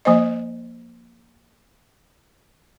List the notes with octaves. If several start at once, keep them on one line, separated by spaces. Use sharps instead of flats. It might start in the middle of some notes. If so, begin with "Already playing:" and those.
F3 A#3 C5 D#5